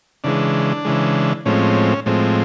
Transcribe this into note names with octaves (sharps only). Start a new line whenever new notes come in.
C#3 E3 G#3 D4
C#3 E3 G#3
A2 F3 G#3 C4 C#4
A2 F3 G#3 C4